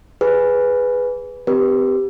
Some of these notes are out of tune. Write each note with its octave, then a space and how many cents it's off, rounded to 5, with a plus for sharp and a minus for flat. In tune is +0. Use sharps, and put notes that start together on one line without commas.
G#4 -5 B4 +0
C4 -35 G4 +0 B4 -40